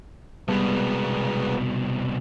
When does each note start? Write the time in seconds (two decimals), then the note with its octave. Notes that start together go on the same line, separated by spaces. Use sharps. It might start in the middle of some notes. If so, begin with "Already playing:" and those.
0.49 C2 B2 G3 G#3 B3